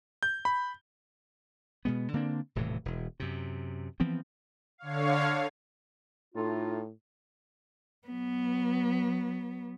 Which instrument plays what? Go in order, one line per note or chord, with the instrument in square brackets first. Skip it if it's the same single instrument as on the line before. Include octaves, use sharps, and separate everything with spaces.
[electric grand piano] G6
B5
[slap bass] B2 G#3 B3
D3 A#3 C4 D4
D#1 A2 C3 E3
E1
F#2 C3
E3 F3 B3 C4
[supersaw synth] D3 C#5 F5
[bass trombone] A2 [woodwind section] A3 D#4 F4
[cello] F#3 B3